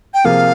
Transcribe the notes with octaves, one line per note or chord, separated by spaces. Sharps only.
G5
C3 F3 A#3 F4 G#4 F5